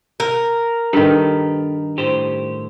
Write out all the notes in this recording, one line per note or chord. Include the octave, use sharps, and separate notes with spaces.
A#4
G2 D#3 G4 A4 B4
A2 G4 C5